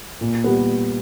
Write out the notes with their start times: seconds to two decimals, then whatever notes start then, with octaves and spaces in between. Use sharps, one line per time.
0.21 A#2
0.44 G3 B3